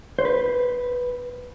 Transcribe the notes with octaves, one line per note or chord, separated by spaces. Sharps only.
C5
B4